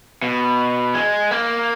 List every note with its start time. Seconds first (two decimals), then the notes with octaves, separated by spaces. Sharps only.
0.22 B2
0.94 G#3
1.31 A#3